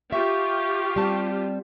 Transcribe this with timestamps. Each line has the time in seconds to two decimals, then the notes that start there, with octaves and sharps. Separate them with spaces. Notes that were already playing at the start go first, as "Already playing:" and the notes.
0.12 F4 G4 E5 C#6
0.96 G3 C4 A5